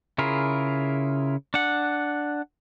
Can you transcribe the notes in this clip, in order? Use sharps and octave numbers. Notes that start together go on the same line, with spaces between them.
C#3 E4 F4 G#4 A#4
D4 F#5